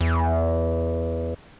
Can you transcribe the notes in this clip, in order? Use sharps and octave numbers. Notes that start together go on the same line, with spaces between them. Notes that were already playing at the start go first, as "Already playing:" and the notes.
E2